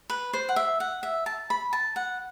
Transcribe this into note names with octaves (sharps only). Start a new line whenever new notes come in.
B4
C5
F#5
E5
F#5
E5
A5
B5
A5
F#5